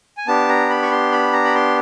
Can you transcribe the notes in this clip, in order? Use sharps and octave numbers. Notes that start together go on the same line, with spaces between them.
G#5
B3 D4 G4 A5
A#5
B5
C#6
C6
B5
A#5
B5
C6